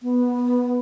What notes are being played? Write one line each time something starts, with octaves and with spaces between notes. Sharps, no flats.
B3